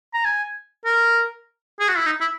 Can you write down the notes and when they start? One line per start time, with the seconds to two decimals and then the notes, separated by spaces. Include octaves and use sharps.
0.14 A#5
0.25 G#5
0.85 A#4
1.79 G#4
1.88 F#4
1.97 E4
2.05 D#4
2.21 E4